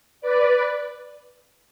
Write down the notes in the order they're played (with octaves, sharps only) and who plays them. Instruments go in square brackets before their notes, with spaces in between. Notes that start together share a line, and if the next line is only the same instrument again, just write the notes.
[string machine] B4 D5